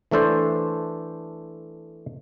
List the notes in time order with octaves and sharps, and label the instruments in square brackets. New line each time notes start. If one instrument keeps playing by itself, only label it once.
[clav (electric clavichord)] E3 A3 D4 A4 C5